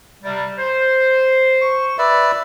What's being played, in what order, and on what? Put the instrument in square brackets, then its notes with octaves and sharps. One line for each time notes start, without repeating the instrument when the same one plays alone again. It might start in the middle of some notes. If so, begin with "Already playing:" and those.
[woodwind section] C3 G3
C5
[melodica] C#6
B4 D5 E5